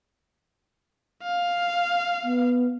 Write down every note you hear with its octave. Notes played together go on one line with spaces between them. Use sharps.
F5
B3